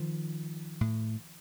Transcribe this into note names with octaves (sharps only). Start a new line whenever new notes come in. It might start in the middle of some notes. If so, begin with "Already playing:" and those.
Already playing: D#3 F3
A2